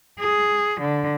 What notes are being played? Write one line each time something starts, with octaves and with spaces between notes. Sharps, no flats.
G#4
D3